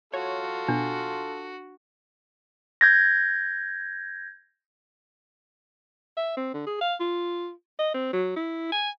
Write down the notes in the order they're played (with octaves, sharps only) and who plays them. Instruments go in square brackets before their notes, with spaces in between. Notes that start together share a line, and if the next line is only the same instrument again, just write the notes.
[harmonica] F4 A4 [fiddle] F#4 [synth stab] C#5
[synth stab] B2 [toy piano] D4
[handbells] G6 G#6 A#6
[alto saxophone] E5
C4
D3
G#4
F5
F4
D#5
C4
F#3
E4
G#5